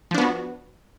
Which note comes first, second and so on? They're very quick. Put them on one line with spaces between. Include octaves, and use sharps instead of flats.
F3 D4 B3 F#4